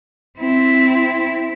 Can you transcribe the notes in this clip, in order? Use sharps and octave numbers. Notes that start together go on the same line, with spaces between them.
C4 E4